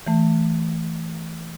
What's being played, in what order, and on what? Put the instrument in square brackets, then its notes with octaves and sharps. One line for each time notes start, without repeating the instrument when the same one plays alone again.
[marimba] E3 A3